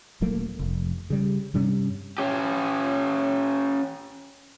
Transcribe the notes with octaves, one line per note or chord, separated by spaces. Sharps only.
D#1 F#3 A3 A#3
F1
C#3 G3
G2 C3 G3 C#4
C#4 G4